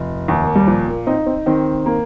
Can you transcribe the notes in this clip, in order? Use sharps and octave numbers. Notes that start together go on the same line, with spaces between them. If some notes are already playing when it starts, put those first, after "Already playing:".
Already playing: F1
D#2
A#3
G3
A#2 F3
A#3
C4 D#4
C4
D#3 C4
A#3